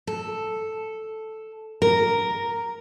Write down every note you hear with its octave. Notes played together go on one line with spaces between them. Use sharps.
A4
A#4